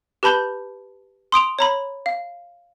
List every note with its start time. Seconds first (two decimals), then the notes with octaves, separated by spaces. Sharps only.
0.23 G4 B4 A5 B5 G6 G7
1.32 C6 D#6 D7 F7
1.59 C#5 A#5 B5
2.06 F5